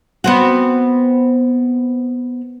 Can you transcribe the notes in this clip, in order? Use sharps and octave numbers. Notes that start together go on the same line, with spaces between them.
B3 C4 F#4